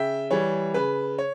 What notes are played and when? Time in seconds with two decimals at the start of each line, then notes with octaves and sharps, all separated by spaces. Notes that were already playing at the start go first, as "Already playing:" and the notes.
Already playing: C#3 E5 G5
0.31 E3 G3 C#5
0.74 C#3 B4
1.18 C#5